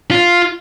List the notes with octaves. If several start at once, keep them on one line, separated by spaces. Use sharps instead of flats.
F4